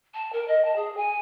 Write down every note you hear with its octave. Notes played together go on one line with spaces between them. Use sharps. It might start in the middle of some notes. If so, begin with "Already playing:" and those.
A5
A#4
D#5
A5
G#4
G#5